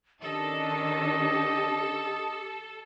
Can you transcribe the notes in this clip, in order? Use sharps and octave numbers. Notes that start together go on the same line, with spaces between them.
D#3 C#4 D4 G4 A4 D#5